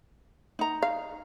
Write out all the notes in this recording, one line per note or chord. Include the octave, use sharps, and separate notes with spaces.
D#4 A#5
F5